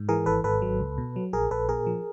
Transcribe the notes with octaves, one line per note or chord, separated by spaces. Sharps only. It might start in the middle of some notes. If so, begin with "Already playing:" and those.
Already playing: G#2
E3 G#4 A#4
G#1 A4 B4
G#1 A4 B4
F#3
C#2
B2
F#3
A#1 G#4 A#4
A#1 A4 B4
A#2 G#4 A#4
F3